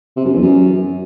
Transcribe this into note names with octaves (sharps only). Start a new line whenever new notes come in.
C3
F#2
E2
F#2